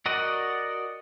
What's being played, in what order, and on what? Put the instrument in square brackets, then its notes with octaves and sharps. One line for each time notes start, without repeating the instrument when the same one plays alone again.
[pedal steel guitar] F#4 A#4 D5 D#5 F#5